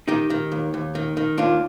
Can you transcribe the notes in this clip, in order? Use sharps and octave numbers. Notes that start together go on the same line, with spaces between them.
D#3 D#4 G4
D#3
D#2
D#2
D#3
D#3
D#2 D4 F4